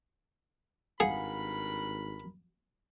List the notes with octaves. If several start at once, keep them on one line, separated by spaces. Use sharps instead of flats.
G#1 G2 G#4 A#4 F5 F#5 G#5 B5